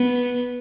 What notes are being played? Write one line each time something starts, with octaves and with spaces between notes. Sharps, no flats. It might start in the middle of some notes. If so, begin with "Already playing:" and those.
Already playing: B3